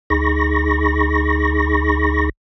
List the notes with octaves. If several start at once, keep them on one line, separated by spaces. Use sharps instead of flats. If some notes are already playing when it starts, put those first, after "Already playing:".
D2 D#4 G#4 B5 C#6 A#6